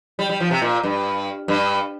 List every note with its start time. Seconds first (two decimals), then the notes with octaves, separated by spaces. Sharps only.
0.19 G3
0.29 G3
0.40 F3
0.51 C3
0.62 A#2
0.83 G2
1.48 G2